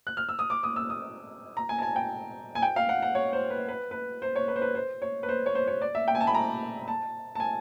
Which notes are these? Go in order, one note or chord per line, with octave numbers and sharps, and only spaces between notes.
F#6
F6
E6
D#6
D6
D#6
E6
D#6
A#5
G#5
A5
G#5
G5
G#5
G5
F5
F#5
F#5
C#5
C5
B4
B4
B4
C5
C#5
B4
C5
B4
C5
C#5
B4
C5
C#5
C5
C#5
D5
E5
G5
G#5
A5
B5
A#5
A5
A5
G#5